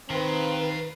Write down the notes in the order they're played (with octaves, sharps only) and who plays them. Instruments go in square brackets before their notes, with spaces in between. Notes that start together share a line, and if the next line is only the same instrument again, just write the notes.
[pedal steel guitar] D#3 [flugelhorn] C4 [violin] B4 [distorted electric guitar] F5 B5